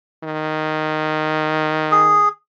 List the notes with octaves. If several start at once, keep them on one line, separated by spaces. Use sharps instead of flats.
D#3
G#4